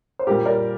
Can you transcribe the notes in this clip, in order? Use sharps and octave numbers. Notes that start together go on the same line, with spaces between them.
C5
A#2 G3 G4 A#4
A#4 D5